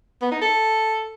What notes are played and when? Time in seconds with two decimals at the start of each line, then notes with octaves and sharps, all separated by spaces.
0.22 B3
0.31 D#4
0.41 A4